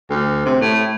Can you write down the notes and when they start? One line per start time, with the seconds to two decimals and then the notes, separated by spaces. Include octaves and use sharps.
0.10 D2
0.46 C3
0.61 A2